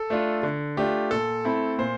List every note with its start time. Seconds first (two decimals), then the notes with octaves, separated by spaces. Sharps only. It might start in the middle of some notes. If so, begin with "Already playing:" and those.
Already playing: A4
0.10 A3 D4 F4
0.43 D3
0.77 A3 D4 F4 G4
1.11 A#2 A4
1.45 A3 C4 E4
1.78 A#2 C5